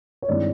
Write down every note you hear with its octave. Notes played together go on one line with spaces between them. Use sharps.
C#5
G2 D#3 G#3 C4 E4 D5